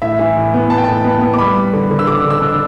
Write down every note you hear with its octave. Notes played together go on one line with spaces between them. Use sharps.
A2 E5
E3
A2
B3
B3 A5
G5
A2 A5
B3
B3
D6
G3 B5
G3
D3
D3
E6
D3 D6
D3
E6
D4